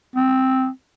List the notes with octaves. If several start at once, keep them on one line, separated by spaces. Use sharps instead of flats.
C4